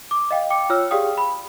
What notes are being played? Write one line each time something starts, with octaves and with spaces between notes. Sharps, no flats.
D6
D#5 F5 G5
G5 D6 C#7
F4 C#5 E6 F6
G4 G#4 D5 F5 G5 D#6
B5